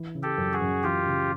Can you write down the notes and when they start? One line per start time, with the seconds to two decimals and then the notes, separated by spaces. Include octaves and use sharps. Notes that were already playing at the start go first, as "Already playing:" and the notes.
Already playing: E3
0.15 C#3
0.23 G4 A4
0.38 F#2
0.53 F#4 G#4
0.61 F#2
0.83 E3 F4 G4
1.06 C#3